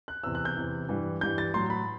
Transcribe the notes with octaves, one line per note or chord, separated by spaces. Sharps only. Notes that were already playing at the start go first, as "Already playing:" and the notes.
F#6
E2 C3 E3 E6
F#6
G6
E2 C3 E3
G2 E3 G3
G2 E3 G3 G6
A6
A2 F#3 C6
B5